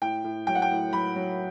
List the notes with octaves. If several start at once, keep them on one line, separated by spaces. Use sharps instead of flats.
A2 G5
A2
F#3 G5
F#5
G5
A2
F#3 B5
F#3